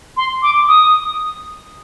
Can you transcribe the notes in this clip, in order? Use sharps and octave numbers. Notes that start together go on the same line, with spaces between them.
C6
D6
D#6